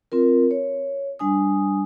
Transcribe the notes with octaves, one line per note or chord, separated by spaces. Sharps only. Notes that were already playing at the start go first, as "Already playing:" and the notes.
C4 F4 A#4
C#5
G3 D4 G#5 D#6